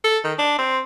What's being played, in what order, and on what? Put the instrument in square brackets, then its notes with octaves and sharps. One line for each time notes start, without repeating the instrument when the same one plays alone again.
[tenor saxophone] A4
D#3
D4
C4